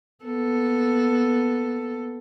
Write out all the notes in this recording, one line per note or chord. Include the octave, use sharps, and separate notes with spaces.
A#3 B3 A4